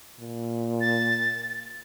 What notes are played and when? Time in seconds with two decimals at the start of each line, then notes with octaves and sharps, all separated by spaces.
0.20 A#2
0.81 A6